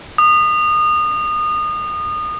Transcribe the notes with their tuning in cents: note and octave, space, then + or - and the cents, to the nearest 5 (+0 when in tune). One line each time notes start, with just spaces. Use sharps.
D#6 -30